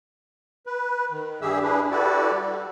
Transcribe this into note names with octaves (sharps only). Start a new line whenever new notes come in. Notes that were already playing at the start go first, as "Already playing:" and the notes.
B4
D#3
G2 G3 G4 G#4 E5 E6
D4 E4 G#4 B4
E4 F#4 G4 A4 B4 D5
G3